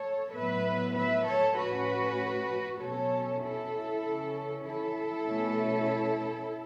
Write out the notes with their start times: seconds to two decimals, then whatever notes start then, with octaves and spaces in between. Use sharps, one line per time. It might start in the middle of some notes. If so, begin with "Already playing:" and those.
Already playing: A4 C#5
0.34 A2 F#3 B3 B4 E5
0.96 B4 E5
1.26 A4 C#5
1.57 A2 A3 C#4 F#4 B4
2.80 B2 F#3 C#4 A4 C#5
3.42 E4 A4
4.04 C#3 E3 C#4
4.65 E4 A4
5.26 B2 A3 C#4